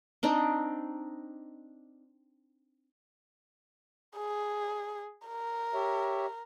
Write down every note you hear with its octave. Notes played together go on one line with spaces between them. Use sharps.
C4 D4 D#4
G#4
A#4
G4 C#5 E5